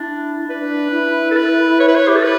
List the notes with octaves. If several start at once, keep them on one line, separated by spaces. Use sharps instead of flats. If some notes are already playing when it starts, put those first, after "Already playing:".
Already playing: D4 E4
D4 B4
E4
A4
B4
C#5
B4
C#5
G4
A4
B4